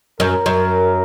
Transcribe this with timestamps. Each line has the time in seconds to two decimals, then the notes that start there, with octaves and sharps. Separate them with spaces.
0.20 F#2 A#4
0.46 F#2